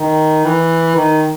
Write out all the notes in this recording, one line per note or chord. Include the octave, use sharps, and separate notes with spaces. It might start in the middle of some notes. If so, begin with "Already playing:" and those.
Already playing: D#3
E3
D#3